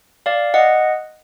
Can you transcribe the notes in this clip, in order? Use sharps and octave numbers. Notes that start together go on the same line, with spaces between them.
D5 F5
D#5 F#5